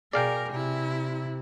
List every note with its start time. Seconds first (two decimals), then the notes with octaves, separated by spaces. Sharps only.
0.13 B2 G#4 A#4 D5 F5 G5
0.52 C3 E4